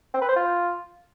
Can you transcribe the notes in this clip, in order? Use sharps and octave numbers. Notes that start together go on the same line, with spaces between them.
C4
B4
C5
F4